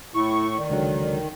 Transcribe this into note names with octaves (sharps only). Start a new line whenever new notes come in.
A2 E4 C#6
D#3 D5
C#2 D3 F#3